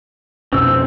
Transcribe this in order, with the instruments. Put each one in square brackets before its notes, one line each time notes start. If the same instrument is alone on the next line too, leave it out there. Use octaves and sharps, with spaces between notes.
[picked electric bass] F2 B2 C#4 [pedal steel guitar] C4 E6